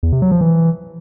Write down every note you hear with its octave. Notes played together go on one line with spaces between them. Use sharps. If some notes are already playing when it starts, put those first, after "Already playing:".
E2
C3
F#3
F3
E3